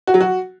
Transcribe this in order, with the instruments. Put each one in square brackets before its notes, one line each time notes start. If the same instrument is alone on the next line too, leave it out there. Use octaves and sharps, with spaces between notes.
[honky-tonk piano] F#4
F#3
F#4